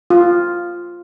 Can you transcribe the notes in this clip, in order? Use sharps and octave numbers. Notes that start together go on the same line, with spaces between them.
F4